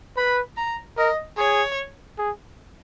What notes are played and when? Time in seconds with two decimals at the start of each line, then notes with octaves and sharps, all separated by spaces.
0.17 B4 B5
0.57 A#5
0.97 A#4 D#5
1.38 G#4 C#5
2.19 G#4